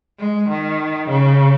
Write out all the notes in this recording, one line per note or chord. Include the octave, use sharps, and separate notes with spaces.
G#3
D#3
C#3